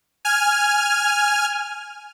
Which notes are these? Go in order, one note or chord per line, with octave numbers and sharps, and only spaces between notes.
G#5 F6